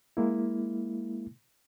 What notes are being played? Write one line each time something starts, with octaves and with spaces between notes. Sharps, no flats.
G#3 A#3 E4